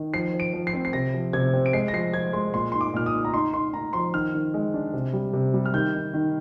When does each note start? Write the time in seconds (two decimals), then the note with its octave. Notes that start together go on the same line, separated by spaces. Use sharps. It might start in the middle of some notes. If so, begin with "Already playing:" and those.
Already playing: D#3
0.14 F3 C7
0.34 F3
0.40 D7
0.54 F3
0.67 C7
0.73 C4
0.85 C7
0.93 C3 A#6
1.14 F3
1.33 C3 G#6
1.54 C4
1.66 D7
1.73 G#3 C7
1.88 A#6
1.93 F3 C7
2.14 F3 G#6
2.33 G#3 C6
2.53 A#2 C6
2.72 D#4 C6
2.81 D6
2.94 A#2 F6
3.06 D#6
3.13 D#4
3.25 A#5
3.33 D#4 C6
3.53 D#4 C6
3.74 D#4 A#5
3.93 F3 C6
4.14 D#3 F6
4.34 D#3
4.54 G#3
4.74 D4
4.93 C3
5.13 G3
5.33 C3
5.54 G3
5.66 F6
5.73 D#3 G6
5.94 D#3
6.14 D#3